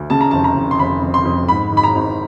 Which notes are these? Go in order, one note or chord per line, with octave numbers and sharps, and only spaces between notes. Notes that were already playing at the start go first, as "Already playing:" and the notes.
Already playing: D2
C#3 A5
A#5
F1 A5
A#5
F1
C6
F1 B5
F2
C6
F2
G#2 B5
G#2 B5
A#5
G#1